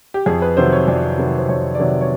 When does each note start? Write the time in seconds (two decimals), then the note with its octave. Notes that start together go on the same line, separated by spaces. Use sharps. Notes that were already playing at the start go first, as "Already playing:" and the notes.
0.14 G4
0.26 F2 G#4
0.42 B4
0.57 C3 D#3 F#3 C5
0.73 C#5
0.88 F2 D5
1.18 C3 D#3 F#3
1.38 C5
1.49 F2 C#5
1.75 D5
1.79 C3 D#3 F#3 C#5
2.01 C#5